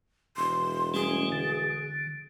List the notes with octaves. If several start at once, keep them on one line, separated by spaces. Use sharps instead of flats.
E1 C6
G3 A3 C#4 G#4
D3